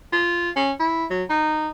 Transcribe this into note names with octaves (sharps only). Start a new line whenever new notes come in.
F4
C#4
E4
F#3
D#4